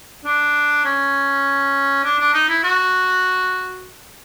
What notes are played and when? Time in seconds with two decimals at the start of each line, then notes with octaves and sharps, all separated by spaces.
0.24 D4
0.85 C#4
2.04 D4
2.19 D4
2.34 D#4
2.49 E4
2.64 F#4